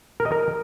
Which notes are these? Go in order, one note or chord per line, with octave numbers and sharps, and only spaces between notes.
A#4
D#5
A#4